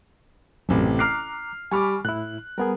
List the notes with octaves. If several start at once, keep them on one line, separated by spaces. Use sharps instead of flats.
A1 F#2 C3
A#5 D6 F6 F#6 C7
G3 G#5 B5 C#6 D6 F6
A2 E4 F#6
G3 B3 G#4 A#4